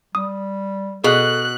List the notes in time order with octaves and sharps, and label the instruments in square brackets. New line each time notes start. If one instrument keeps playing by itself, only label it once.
[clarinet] G3 [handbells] D#6
[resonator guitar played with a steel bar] B2 [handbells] G#4 [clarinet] A4 [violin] F#6